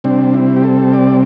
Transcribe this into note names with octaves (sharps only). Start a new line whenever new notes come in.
C3 G3 C4 D4
E4
G4
A4
D5